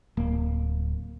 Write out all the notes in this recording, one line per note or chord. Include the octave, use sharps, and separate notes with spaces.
D1 A#3